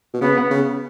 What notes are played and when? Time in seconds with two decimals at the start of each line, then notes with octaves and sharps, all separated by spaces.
0.14 B2
0.21 C#3 B3
0.51 C#3